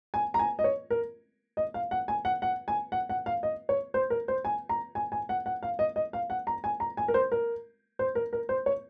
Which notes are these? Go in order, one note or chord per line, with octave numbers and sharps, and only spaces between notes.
G#5
A#5
G#5
D#5
C#5
A#4
D#5
F5
F#5
G#5
F#5
F#5
G#5
F#5
F#5
F5
D#5
C#5
C5
A#4
C5
G#5
A#5
G#5
G#5
F#5
F#5
F5
D#5
D#5
F5
F#5
A#5
G#5
A#5
G#5
A#4
C5
A#4
C5
A#4
A#4
C5
C#5